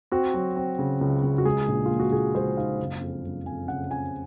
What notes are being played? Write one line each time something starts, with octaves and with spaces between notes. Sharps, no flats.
C4 F#4
F#3
C4
C#3
C#2
C#2
F#4
G#3 G#4
A#1
A#2 F4
F#4
A#1 G#4
G#3 C5
D#4 F5
F#1
F2
F#1
F2 G#5
C#3 F#5
C#3 G#5